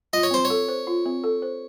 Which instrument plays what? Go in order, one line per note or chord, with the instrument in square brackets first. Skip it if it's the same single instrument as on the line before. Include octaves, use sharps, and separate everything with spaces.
[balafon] F4 [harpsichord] D#5
[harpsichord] C#5
[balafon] C4 [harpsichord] C5
[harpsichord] C#5
[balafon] A4
C5
F4
C4
A4
C5